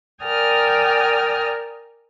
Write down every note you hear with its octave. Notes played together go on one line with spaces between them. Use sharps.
A#4 D5 G5 G#5 D#6 F6